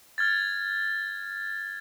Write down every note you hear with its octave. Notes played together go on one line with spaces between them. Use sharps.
F6 G#6 A6